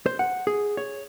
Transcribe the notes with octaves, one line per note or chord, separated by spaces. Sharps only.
C5
F#5
G#4
C#5